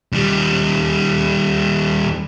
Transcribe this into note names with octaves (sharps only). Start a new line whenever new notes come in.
D#2 G3